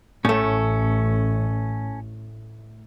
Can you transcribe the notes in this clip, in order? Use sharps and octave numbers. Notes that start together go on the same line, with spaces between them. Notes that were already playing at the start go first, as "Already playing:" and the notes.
A1 A2 A3 C#4 A4